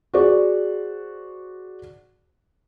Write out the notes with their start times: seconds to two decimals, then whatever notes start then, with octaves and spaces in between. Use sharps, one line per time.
0.14 F#4 G#4 C5 D5